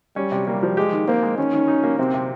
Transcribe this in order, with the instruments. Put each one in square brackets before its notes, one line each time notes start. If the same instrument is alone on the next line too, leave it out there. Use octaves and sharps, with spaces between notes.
[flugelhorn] G3 [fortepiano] C#4
[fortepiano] C3
[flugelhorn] G3 [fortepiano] A#3
[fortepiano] F3
[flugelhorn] G#3 [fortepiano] G4
[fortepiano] D#3
[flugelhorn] A#3 [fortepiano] C4
[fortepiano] G#3
[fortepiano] D#3 [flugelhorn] C#4
[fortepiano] D#3
D#4
A#3
[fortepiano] C3 [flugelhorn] C4
[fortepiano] C3